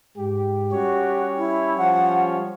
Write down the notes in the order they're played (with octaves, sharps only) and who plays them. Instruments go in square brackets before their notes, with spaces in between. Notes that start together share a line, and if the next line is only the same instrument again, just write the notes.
[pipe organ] G#2 [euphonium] G4
[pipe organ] G3 C#4 C#5 [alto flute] F#4
[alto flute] E4
[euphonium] F3 [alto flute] F#5